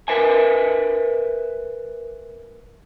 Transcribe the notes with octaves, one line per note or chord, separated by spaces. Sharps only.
A#4 B4 E5 G#5